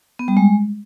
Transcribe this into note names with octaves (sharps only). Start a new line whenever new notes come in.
B3
G3
G#3